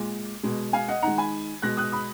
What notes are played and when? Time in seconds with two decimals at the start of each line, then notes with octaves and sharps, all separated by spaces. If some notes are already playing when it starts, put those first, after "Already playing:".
Already playing: A#2 G#3
0.43 B2 G#3
0.73 F5 G#5
0.88 D#5 F#5
1.02 D#3 G#3 F#5 A#5
1.18 G#5 B5
1.62 B2 G#3 F#6 A#6
1.77 D#6 F#6
1.92 B5 D#6